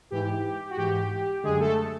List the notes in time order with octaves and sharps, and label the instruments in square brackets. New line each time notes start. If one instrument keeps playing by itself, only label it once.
[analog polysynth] G#2 E3 G4
F#4
G#2 E3 G4
F#2 D3 G#3 G#4
A3 A4